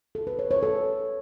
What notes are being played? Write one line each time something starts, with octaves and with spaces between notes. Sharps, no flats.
A4
B4
C#5
C#5
A4